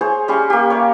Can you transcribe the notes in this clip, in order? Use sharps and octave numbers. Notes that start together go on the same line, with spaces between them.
G#4 C5 C#5
G3 C#4 C6 C#6
A#3 G4
C#5 D5 F5